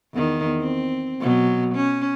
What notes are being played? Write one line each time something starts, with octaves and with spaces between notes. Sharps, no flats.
E2 D#3
C4
B2 F#3
C#4